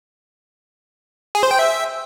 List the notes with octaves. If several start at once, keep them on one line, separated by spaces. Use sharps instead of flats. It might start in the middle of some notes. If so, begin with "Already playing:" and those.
G#4
C5
G5
E5